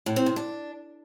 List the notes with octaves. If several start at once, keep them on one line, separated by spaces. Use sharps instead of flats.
A2
C4
C3
D4